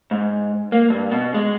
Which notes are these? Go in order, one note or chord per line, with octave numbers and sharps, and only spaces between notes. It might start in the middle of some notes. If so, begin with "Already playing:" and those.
G#2
A#3
G2
B2
G#3